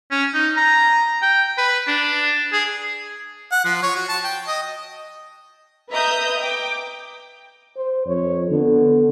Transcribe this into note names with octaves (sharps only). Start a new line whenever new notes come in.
C#4
D#4
A#5
G5
B4
D4
G#4
F#5
F3
C#5
F#4
A5
G5
D#5
B4 D#5 E5 A#5 D#6 G6
G5 D6
C5
F2 C#5
D3 B3